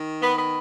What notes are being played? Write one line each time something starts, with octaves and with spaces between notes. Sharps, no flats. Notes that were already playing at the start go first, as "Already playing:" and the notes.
Already playing: D#3
B3
B3